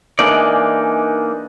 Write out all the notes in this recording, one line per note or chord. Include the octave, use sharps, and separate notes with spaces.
E3 G#3 A#3 D4 D#4 D5